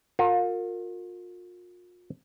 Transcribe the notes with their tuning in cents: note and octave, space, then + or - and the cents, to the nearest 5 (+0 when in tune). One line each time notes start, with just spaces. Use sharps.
F4 +35 A#4 -25